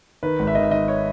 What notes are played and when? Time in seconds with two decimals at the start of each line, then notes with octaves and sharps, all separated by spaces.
0.23 D#3 B4
0.39 G#1
0.47 E5
0.55 D#3 D#5
0.63 E5
0.71 D#3 D#5
0.88 C#5